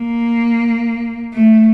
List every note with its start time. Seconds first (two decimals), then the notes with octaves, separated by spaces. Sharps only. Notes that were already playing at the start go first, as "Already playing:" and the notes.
Already playing: A#3
1.34 A3